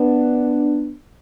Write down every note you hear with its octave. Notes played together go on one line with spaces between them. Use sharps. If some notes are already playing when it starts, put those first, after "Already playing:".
Already playing: B3 D4